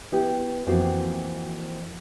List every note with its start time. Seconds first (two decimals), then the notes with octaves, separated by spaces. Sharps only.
0.12 B3 E4 G4
0.67 F2 E3 A#3 C4 F4 F#4